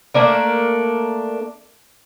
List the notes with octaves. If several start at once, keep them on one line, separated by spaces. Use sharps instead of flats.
A3 A#3 D4 A#4